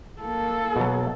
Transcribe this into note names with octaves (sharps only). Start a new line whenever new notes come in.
A#3 A4
B2 F#3